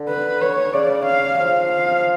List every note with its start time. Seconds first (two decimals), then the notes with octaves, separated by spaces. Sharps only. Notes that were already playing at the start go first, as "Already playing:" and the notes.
Already playing: D3
0.09 B4
0.42 C#5
0.74 C#3 D5
1.06 F5
1.39 F3 F5
1.72 F5